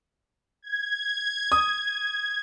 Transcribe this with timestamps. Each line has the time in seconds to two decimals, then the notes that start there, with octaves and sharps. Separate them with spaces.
0.62 G#6
1.52 D#6